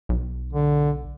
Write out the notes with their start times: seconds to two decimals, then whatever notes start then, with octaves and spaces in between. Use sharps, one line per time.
0.09 B1
0.53 D3